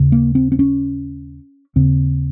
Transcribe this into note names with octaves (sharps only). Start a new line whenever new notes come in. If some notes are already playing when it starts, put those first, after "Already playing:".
Already playing: D#2 C#3
A#3
C4
C4
C#4
D#2 C#3 C4